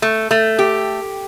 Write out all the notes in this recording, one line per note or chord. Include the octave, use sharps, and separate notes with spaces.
A3
A3
G4